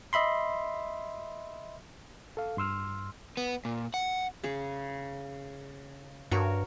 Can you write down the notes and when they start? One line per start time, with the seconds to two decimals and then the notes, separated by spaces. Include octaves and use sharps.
0.13 D#5 E5 B5 C6
2.37 A4 F5
2.57 G2 C6 E6 F6
3.37 B3
3.65 A#2
3.94 F#5
4.44 C#3 G#4
6.31 G2 F#4 A#4 C#5